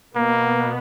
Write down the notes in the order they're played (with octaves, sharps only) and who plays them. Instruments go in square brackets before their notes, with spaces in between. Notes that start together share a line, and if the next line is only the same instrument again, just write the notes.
[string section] B2 B3 [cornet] A#3